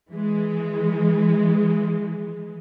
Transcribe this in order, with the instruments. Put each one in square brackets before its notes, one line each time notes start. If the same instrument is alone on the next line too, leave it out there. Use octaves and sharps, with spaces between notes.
[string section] E3 G#3